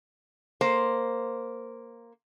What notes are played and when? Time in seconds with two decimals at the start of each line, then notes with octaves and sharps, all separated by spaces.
0.61 A#3 C5